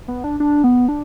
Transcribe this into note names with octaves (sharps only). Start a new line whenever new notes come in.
B3
D4
D4
B3
D4